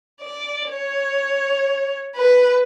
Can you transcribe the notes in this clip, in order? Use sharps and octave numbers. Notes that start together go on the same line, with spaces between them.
D5
C#5
B4